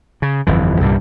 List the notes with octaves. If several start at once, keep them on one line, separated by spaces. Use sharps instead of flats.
C#3
G1 F2 E3
C2 G2 A#2 G3